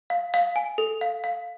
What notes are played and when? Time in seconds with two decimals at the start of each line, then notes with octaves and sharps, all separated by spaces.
0.10 F5
0.34 F5
0.56 G#5
0.78 A4
1.01 F5
1.24 F5